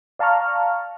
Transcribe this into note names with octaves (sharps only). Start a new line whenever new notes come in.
D5 F5 A5 A#5 C#6 F6